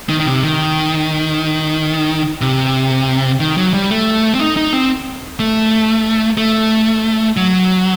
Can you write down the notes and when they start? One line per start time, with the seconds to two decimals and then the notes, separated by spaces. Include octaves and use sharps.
0.09 D#3
0.20 D#3
0.26 C3
0.43 D#3
2.41 C3
3.40 D#3
3.58 F#3
3.73 G3
3.90 A3
4.35 C4
4.39 D#4
4.57 D#4
4.73 C4
5.39 A3
6.37 A3
7.37 F#3